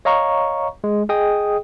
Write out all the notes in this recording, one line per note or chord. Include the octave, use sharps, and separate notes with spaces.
C#5 D#5 F5 A#5 C#6
G#3
G#4 D#5 G5 D#6